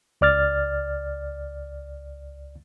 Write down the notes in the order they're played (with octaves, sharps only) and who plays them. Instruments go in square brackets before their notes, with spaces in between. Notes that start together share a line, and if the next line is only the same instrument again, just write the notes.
[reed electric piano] C#2 D5 F6 A6